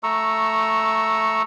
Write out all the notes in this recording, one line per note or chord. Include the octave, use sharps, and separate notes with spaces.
A3 A#5 C#6 E6